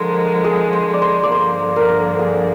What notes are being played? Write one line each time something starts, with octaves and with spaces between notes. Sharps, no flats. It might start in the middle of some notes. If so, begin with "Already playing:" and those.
Already playing: D3 F3 G#3 A#4 C5
G#4
C5
D5
C5
D5
G2 D3 F3 A#3 C5
A#4
G#4